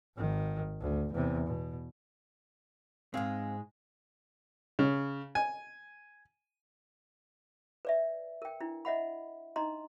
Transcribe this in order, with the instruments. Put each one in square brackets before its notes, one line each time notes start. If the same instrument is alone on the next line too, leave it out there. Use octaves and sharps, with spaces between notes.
[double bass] G#1 D#3
D2
E2 C3
B2
[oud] G#2 G#3 [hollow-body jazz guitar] C4 F5
[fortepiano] C#3
G#5
[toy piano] B4 D5 E5
A#4 G5
D4 E4
D#5 E5 F#5 B5
D4 D#4 D#5 A#5 C6